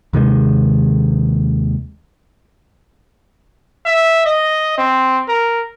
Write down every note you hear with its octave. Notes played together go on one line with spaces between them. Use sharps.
D#2 C3 D#3 G#3
E5
D#5
C4
A#4